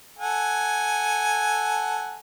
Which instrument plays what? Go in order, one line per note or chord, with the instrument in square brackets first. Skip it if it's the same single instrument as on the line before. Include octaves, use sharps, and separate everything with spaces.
[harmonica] A4 F#5 G#5